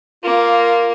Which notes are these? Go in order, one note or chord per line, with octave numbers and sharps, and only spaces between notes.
A#3 F4